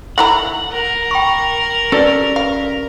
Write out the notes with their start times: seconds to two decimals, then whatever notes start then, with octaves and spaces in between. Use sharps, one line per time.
0.18 A3 E4 F#5 A#5
0.72 A#4
1.11 G5 B5 C#6
1.92 C#4 F#4 G4 A4 B4 D5
2.36 F5